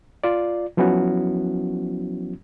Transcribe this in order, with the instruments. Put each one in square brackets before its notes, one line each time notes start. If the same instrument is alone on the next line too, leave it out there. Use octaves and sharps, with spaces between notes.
[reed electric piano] F4 D5
F3 F#3 B3 C#4 E4 F#4